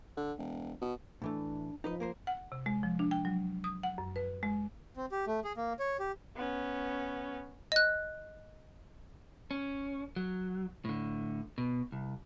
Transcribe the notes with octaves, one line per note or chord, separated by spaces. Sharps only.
D3
E1
B2
A2 E3 A3 D4
F3 D#4 B4 D#5
A#3 A#4 C5
F#5
C3
G#3
F3
D4
G5
F#3
D#6
F#5
F#2
B4
G#3
C4
G4
A3
G#4
A#3
C#5
G4
B3 C#4
D#5 F#6
C#4
F#3
A2 D3
B2
C2